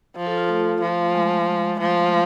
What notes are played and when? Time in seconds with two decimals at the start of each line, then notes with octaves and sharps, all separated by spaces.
0.16 F3
0.27 F4 A4
0.38 F4
0.49 A3
0.81 F3
1.14 G#3
1.31 A3
1.47 G#3
1.80 F3 A3